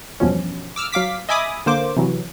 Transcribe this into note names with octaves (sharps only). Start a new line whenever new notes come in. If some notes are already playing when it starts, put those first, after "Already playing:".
E2 G2 B2 F3 C#4
D6 E6 F6
F#3 F5 D6 B6
D#5 E5 G#5 B5 D6 D#6
D3 A#3 C5 D6
C3 E3 F#3